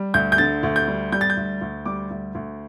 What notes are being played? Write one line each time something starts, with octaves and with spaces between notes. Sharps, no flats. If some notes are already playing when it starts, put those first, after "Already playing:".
Already playing: G3
D2 G6
G6
D3 A6
D2
G6
G3
G3 G6
A6
G6
D2
D2
G3 D6
D2
D2